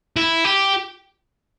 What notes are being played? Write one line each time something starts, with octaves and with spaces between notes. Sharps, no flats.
E4
G4